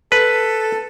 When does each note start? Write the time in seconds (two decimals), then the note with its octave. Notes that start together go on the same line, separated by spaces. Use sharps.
0.12 A4 B4